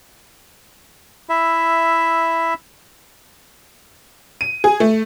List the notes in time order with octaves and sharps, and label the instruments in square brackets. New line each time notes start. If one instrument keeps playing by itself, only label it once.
[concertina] E4 E5
[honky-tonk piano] D#7
G#4
A3